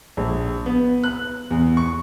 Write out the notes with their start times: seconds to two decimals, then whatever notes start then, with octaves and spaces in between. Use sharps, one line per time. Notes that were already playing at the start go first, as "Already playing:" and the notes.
0.17 A#1
0.66 B3
1.04 F#6
1.51 E2
1.77 C#6